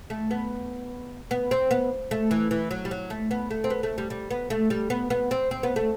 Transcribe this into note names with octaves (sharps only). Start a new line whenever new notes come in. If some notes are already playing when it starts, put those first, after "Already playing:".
A3
B3
B3
C4
B3
A3
E3
E3
F#3
G3
F#3
A3
B3
A3
C4
B3
A3
G3
G3
B3
A3
G3
B3
B3
C4
C4
B3
A3